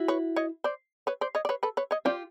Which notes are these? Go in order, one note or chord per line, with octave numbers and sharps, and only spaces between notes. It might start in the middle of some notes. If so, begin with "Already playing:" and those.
Already playing: E4 F#4
B4 C#5
C#5 D#5
C5 D5
B4 C#5
C5 D5
C#5 D#5
D5
B4 C#5
A4 B4
B4 C#5
C#5 D#5
F4 G4 C5 D5